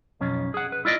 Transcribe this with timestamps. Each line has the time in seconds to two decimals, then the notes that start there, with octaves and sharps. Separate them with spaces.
0.21 B1 F2 C#4
0.54 G#4 F#5
0.72 B4
0.85 E4 F4 D5 D#5